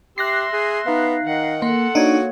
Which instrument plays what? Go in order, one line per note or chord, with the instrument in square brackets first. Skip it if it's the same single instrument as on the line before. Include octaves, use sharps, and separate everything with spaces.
[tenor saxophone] G4 [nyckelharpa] E5 C6 [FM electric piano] F#6 A#6 C7
[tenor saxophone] G#4
[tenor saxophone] B3 [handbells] D#4 F5
[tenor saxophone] D#3 [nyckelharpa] F#5
[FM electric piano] A#3 [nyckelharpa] A4 F#5 [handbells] C6
[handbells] A#3 C#5 [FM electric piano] D4 D#4 [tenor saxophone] F#4